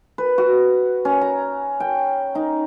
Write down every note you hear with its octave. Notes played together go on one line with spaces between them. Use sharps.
B4
F#4
C#4
A#5
G5
D#4